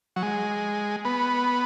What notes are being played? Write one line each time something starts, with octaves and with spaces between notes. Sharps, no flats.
F#3
G#3
B3